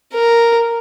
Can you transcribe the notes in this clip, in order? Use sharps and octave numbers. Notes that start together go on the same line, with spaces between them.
A#4